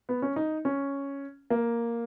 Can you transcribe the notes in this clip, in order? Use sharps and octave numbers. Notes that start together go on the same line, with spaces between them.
B3
C#4
D#4
C#4
A#3